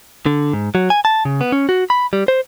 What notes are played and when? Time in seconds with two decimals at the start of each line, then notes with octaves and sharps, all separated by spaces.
0.26 D3
0.53 G#2
0.75 F#3
0.90 G#5
1.05 A5
1.25 C#3
1.41 B3
1.52 C#4
1.69 F#4
1.90 B5
2.13 G3
2.28 C5